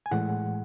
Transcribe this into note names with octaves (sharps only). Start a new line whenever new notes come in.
G#5
A2 E3 G#3 F#5